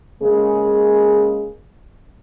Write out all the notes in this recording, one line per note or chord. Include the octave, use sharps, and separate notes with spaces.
C#3 G#3 A#3 G#4